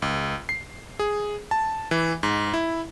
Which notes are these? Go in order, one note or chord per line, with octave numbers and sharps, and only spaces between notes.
C#2
C7
G#4
A5
E3
G#2
E4